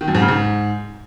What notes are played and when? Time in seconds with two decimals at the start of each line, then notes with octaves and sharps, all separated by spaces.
0.01 D#3
0.08 F#2
0.15 G#2
0.22 C#3
0.28 G#2